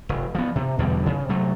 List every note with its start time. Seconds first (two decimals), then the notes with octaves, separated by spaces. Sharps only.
0.09 F1
0.35 F3 B3
0.56 C3
0.78 E2 B2 D3 G3
1.06 C#3
1.29 C3 F#3 A3